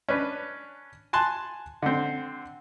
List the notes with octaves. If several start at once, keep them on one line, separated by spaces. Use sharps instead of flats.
C#4 D4 B4
G#5 A5 C6 F#6
D3 C4